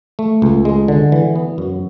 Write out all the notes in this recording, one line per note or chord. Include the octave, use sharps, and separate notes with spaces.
A3
C#2
G#3
D3
E3
B3
F#2